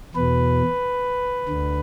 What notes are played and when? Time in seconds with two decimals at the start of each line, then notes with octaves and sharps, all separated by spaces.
0.15 E2 B2 B4
1.49 D2 D3